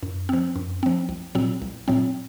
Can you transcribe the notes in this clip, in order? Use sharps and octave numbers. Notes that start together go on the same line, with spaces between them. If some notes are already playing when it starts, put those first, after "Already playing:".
F#2
F3 C4
F#2
F3 C4
C2
A#2 F#3 C4
C2
A#2 F#3 C4